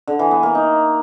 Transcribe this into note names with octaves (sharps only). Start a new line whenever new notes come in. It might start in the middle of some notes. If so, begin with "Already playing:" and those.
D3
E3
B3
A#3
D#4